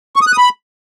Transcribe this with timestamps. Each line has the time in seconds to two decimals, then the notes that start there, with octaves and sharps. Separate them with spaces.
0.16 C#6
0.21 D#6
0.27 F#6
0.32 D#6
0.38 B5